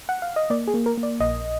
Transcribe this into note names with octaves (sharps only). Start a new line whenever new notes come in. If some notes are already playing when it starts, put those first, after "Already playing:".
F#5
F5
D#5
A#3 D5
G#4
A#3
A#4
A#3
D5
A#1 D#5